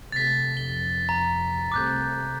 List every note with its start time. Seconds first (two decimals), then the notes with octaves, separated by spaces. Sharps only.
0.12 C3 A3 A6 B6
0.57 F1 G7
1.09 A#5
1.72 C2 C3 A3 D6 F#6 G6